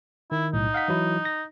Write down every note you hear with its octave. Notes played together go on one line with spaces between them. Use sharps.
D#3 E4
B1 A2 D#4
F5 F#5 B6
E3 F#3 E4
A#6